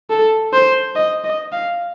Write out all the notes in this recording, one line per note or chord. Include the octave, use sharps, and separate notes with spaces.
A4
C5
D#5
D#5
F5